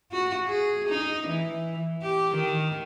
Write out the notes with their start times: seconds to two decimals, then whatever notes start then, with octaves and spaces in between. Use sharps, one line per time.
0.12 F#4
0.46 G#4
0.89 D#4
1.28 E3
2.02 G4
2.35 D#3